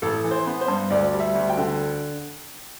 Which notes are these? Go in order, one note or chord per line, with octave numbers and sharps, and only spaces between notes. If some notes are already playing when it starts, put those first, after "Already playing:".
A1 A4
E3
C5
B3
C5
G2
D2 D5
G3
E5
D2
G5
D3